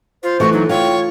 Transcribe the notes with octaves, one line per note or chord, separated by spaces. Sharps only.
F4 C5
E3 A3 F#4
F#3 D#4
F4 C#5 G5